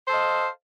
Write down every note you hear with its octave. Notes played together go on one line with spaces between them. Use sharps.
A4 C5 D#5 F5